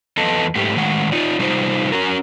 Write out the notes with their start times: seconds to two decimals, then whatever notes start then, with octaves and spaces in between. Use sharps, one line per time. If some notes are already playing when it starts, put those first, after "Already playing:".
0.17 E2 B3 A4 D#5 A5
0.55 G#2 A3 G4
0.76 A2 D#3 G#3 F#5
1.12 D#4 F4 D5
1.39 C3 G3 D#4 F4 B4 C5
1.92 C#4 F#4 A#4